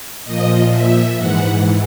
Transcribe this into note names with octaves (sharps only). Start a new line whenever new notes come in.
A#2 F3 D#5
E5
G#2 E3 F#5